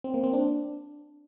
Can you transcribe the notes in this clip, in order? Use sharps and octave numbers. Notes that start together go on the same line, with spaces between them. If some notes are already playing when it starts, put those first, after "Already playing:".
C4
A#3
C4
D4